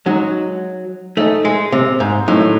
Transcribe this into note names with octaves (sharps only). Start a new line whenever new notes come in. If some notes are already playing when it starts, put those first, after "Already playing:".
F#3 G#3 D#4 F#4
A3 D#4 G#4 D#5
G#3
C3
G#2
A2 D#3 F#3 C4 D#4 F#4